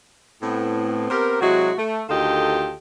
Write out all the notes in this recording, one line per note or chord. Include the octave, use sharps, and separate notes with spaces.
A2 B3 C4
B3 C4 G4 A#4
C3 F#3 G#3 E4 F#4
A3
D2 D#3 F4 G4 A4 D#5